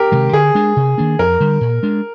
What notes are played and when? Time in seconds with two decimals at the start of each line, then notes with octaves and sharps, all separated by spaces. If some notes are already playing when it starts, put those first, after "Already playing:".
Already playing: G4 A#4
0.12 C3 D#3 G#3
0.33 D3 G#4
0.55 G#3 D4
0.76 C3
0.98 D#3 A#3 D4
1.19 F2 A#4
1.40 D3 G3
1.61 A#2
1.83 G#3 D4